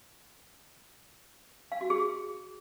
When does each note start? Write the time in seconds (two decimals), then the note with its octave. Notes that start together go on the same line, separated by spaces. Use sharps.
1.72 F5
1.81 F#4
1.90 G#4